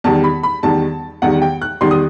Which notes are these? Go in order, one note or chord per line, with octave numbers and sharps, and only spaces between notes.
E2 D#3 G3 A5
B5
B5
E2 D#3 G3 A5
E2 D#3 G3 F#5
G5
F#6
E2 D#3 G3 C6
D#6